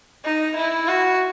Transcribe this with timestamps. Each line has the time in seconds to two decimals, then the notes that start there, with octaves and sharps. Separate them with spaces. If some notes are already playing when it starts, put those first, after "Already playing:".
0.24 D#4
0.56 E4
0.88 F#4